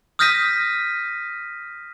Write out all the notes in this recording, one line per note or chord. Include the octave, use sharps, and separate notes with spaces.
D#6 F6 G6 A#6 B6 D#7